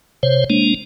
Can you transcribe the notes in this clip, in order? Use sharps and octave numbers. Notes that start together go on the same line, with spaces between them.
C3 C5 C#5
G#3 A#3 D4